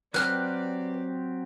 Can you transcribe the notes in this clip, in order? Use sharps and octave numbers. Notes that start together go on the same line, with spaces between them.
F#3 C4 G4 B4 D5 F6 F#6